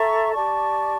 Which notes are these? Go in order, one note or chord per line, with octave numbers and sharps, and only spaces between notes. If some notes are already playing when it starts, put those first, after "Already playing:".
Already playing: A4 E5 A#5 C#6
G4 D5 A5 C#6